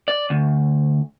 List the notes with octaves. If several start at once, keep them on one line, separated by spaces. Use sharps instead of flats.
D5
D2